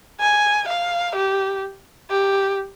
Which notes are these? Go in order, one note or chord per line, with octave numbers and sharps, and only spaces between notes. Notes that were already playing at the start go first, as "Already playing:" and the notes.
G#5
F5
G4
G4